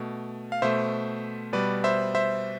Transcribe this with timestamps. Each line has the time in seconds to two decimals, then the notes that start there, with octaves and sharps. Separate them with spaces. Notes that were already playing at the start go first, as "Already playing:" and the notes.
Already playing: B2 A3
0.52 F5
0.62 B2 A3 C5 E5
1.53 B2 G3 B4 D5
1.84 C5 E5
2.15 C5 E5